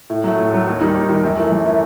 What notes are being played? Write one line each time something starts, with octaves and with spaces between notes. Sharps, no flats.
A2
F#3 A3
A2
F#3 A3
D#2
D#3 G3 D#4
D#2
D#3 G3 D#4
F#2
E3 A3
F#2
E3 A3